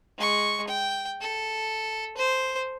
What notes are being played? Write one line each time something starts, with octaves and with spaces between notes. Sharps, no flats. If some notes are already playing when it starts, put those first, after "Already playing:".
G#3 C#6
G5
A4
C5